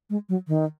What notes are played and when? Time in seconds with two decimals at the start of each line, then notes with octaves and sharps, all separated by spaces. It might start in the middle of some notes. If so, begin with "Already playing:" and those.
0.10 G#3
0.29 F#3
0.48 D#3